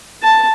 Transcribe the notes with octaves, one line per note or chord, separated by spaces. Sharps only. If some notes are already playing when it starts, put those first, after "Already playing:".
A5